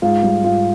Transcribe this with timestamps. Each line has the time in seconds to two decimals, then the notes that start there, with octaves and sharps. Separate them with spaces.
0.02 G#2 F4
0.23 G3
0.43 G#2 F4